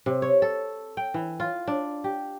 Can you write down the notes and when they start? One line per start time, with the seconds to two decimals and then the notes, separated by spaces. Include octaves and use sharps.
0.06 C3
0.22 C#5
0.42 A4
0.97 G5
1.14 E3
1.40 F4
1.67 D4
2.04 G4